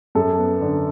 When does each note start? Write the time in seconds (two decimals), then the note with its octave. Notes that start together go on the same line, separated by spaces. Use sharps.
0.15 F#2 A4
0.38 B3
0.61 D3